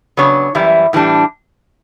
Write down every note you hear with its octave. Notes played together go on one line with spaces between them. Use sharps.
C#3 F#3 B3 D4 C#5
F#2 E3 G3 E4
A2 E3 G3 D4